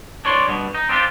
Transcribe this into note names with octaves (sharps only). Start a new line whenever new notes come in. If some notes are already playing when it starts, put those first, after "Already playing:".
D4 C#5 D5 C6
G2 B2
D#4
C4 D4 D#4 F4 G4